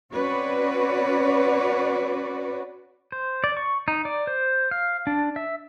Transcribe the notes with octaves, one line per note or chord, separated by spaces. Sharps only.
C4 C#4 F#4 B4 C#5 D5
C5
D5
C#6
D#4
D5
C5
F5
D4
E5